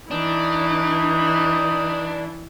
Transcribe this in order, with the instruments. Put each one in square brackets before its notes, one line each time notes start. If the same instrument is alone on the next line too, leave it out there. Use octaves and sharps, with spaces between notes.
[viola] E3 [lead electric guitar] D4 [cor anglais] D#4